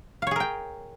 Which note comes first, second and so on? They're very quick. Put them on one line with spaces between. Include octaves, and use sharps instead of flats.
F5 C#5 G#4 A#4 G5